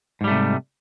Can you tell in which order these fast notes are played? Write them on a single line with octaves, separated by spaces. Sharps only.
G#2 G3 A3 C3